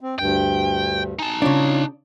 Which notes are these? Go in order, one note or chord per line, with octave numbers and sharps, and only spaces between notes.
C4
D2 G2 G5
D#4 G#5 A5
C#3 D4 F4 C#5